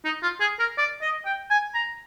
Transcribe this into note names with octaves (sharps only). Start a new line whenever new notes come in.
D#4
F4
G#4
A#4
D5
D#5
G5
G#5
A#5